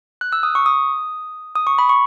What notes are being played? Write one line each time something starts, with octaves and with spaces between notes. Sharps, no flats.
F#6
E6
D#6
C#6
D#6
D#6
C#6
B5
C#6